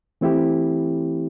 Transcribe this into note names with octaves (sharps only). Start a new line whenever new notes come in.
E3 A3 C4 E4 G4